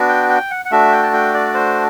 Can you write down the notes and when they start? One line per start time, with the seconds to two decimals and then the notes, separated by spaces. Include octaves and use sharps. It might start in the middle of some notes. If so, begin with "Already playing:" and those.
Already playing: B3 D4 F#4
0.09 G5
0.30 G5
0.51 F#5
0.65 F#5
0.71 A3 D4 F#4 E5
0.92 G5
1.03 A5
1.13 G5
1.34 D5
1.54 C5